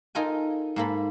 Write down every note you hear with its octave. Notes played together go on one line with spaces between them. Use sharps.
D#4 F4 A4 A#4 G5 G#5
G#2 A#3 A4 B5